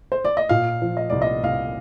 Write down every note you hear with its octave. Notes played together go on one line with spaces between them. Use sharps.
C5
D5
D#5
A#2 F5
F3
D#5
C2 D5
D#5
C2 F5